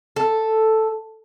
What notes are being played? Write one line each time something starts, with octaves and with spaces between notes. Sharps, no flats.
A4